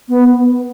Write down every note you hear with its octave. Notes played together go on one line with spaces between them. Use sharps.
B3